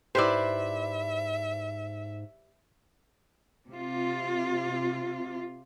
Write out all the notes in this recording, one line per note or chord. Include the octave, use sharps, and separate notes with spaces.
G#2 E4 G4 B4 C5 D5 E5
C3 F4